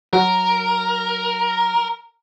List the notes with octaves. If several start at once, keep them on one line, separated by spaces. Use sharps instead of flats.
F#3 A#4